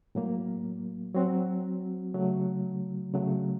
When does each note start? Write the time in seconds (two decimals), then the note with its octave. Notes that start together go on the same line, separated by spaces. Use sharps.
0.15 A2 F#3 A#3
1.14 F#3 C4 F#4
2.14 C#3 F#3 A3
3.14 C#3 F#3 A3